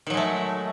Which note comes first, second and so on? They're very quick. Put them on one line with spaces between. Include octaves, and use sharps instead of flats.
D#3 F#3 G#3 A3